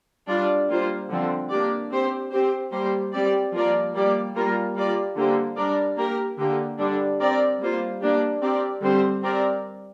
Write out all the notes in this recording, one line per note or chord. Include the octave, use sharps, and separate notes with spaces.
G3 D4 F4 D5
G3 A#3 F4 C5
D3 F3 C4
A#3 D4 G4 D5
C4 G4 C5
C4 G4 C5
G3 A#3 G4 C5
G3 C4 G4 D5
F3 A#3 F4 A#4 D5
G3 A#3 G4 D5
G3 A#3 F4 A#4
G3 A#3 F4 D5
D3 A#3 G4 C5
G3 D4 A#4 D5
A#3 G4 A#4
D3 A#3 G4
D3 G3 D4
C4 A#4 D5
G3 A#3 F4 C5
A#3 D4 G4
C4 G4 A#4 D5
D3 G3 C4 G4 C5
C4 G4 A#4 D5